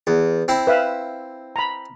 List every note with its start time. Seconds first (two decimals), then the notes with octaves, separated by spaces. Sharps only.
0.07 E2
0.48 C4 E4
0.67 B4 E5 F5
1.56 A#5 B5